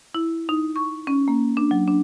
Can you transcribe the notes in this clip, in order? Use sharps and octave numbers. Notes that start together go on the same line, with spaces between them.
E4
D#4
C#6
C#4
A#3
D4
F#3
D4